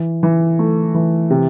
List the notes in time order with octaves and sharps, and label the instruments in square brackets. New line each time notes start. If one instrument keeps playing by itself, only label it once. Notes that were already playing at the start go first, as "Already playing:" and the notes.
Already playing: [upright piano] E3
E3
A3
E3
C3